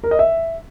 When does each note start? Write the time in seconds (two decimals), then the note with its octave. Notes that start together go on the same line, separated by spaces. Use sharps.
0.04 A#4
0.11 D#5
0.19 E5